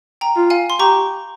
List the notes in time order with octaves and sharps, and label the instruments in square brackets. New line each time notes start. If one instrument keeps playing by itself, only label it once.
[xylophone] G5 A#5
[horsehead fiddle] F4
[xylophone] F5 G#5
C6
[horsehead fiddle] G4 [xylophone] A#5 C#6